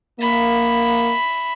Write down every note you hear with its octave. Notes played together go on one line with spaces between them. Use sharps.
A#3 E5 B5